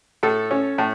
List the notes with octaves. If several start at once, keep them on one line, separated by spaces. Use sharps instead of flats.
A2 A4
C#4
A2